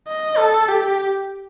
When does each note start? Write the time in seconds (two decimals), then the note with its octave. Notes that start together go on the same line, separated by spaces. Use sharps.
0.08 D#5
0.38 A4
0.68 G4